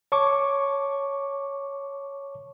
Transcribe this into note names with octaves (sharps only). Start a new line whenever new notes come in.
C#5 A5 C#6 D6